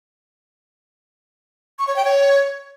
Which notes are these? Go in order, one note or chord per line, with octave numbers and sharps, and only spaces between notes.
C#6
C#5
G5
C#5